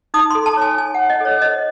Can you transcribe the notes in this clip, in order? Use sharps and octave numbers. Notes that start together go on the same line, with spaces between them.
D#4 D#6
A4 C6
A5
C#5 G#5
D#4 G#5
C#5 F#5
D#5
A4 C#5
C5 D#5